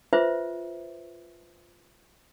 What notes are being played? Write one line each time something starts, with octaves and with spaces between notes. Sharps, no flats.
F4 B4 C5 E5